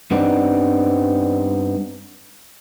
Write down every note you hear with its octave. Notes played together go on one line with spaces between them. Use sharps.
G2 G3 B3 C4 D4 D#4